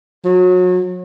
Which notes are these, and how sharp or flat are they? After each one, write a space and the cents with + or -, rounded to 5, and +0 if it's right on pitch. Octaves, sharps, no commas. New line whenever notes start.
F#3 -30